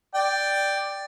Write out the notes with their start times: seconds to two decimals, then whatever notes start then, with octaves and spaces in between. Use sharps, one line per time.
0.15 D5 G5